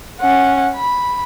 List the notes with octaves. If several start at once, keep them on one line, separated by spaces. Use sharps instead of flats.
C#4 F#5
B5